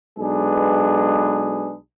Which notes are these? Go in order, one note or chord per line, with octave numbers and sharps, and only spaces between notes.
B1 G#3 D4 G#4 B4